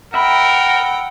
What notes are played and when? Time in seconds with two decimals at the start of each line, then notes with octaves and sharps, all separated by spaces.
0.14 A#4 E5 F#5 G5 B5